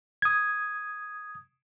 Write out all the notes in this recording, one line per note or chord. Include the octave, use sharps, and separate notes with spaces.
D#6 G#6